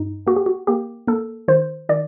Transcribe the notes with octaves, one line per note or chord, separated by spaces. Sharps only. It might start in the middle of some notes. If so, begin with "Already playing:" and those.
Already playing: G2 D#4
A#3 F#4
G4
F#4
A#3 G4
A#3 A4
D#3 C5
D#3 D5